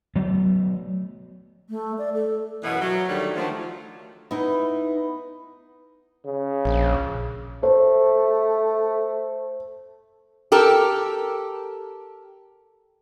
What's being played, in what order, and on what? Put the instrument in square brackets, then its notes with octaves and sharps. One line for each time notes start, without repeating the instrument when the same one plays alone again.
[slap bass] F#3 A3 B3
[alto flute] A3
D5
A4
[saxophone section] F#2 B2 E3 B3 F#4
F#3
D2 D#3 G3 A3 C#5
D3 D#3 F3 F#3 A3
[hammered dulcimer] B3 B4 [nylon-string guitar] D#4 E4 D#5
[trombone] C#3
[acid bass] A#1
[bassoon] A3 [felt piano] C5
[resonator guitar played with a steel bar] G4 A4 A#4